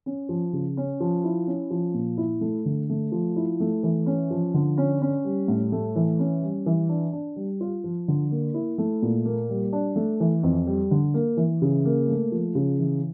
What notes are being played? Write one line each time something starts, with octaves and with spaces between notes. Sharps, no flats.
C#4
F3
C#3
C#4
F3
E4
C#4
F3
A#2
E4
A3
D3
A3
F3
E4
A3
E3
C#4
F3
D3
C#4
C#4
G3
A2
A3
E3
C#4
G3
E3
D4
D4
G3
F4
F3
D3
A#3
E4
A3
A#2
A#3
G3
D4
A3
E3
F2
G3
D3
A#3
E3
C#3
A#3
A3
F3
C#3
E3